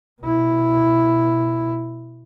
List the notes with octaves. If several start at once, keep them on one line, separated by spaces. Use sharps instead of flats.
B2 E4